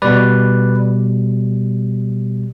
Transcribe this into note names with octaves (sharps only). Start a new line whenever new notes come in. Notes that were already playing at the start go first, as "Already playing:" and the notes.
B2 G3 B4 D5